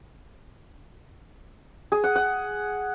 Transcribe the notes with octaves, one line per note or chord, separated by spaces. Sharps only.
G#4
F#5
F#5